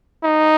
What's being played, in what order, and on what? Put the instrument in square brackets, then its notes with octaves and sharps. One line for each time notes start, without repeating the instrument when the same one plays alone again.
[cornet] D#4